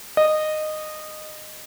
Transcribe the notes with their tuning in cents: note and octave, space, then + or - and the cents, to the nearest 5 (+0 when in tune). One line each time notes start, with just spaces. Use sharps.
D#5 -15